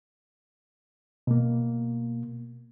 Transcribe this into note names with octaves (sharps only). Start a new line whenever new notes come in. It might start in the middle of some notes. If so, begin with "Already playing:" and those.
B2 A#3